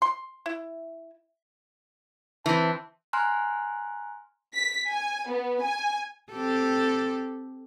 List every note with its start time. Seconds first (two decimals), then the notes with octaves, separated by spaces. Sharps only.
0.02 C6
0.46 E4
2.46 E3 C4 A5
3.13 G#5 A#5 C6 F6 F#6
4.54 B6
4.89 G#5
5.29 B3
5.62 G#5
6.32 C4 G4 A4